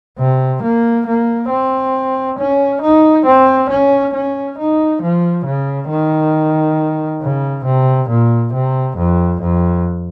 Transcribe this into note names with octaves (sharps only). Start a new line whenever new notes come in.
C3
A#3
A#3
C4
C#4
D#4
C4
C#4
C#4
D#4
F3
C#3
D#3
C#3
C3
A#2
C3
F2
F2